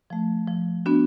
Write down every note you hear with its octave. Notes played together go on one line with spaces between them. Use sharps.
F3 A3
F3
B3 D4 F#4